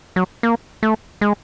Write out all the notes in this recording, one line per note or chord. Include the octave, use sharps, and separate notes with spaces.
F#3
A#3
A3
G#3